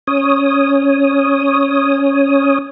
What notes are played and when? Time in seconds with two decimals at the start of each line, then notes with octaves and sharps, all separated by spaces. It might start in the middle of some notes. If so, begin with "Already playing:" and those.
0.07 C#4 C#5 D#6